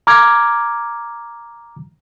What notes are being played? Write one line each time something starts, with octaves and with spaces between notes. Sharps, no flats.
A#5 D6 F6 G#6